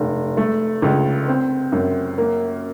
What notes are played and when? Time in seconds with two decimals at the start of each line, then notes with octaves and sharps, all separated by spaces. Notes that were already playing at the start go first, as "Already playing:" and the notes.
Already playing: F1
0.37 A3
0.82 C#2
1.28 C4
1.72 F#2
2.18 A#3